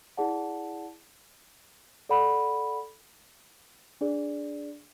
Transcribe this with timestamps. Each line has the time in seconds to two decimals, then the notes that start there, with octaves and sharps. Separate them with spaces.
0.17 E4 G#4 D5 F#5 A5
2.09 A4 D5 F#5 B5
4.01 D4 G#4 D5